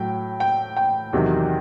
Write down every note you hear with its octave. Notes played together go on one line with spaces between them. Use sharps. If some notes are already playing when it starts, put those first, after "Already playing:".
Already playing: A2 F#3 G5
G5
G5
E2 C3 D#3 F#3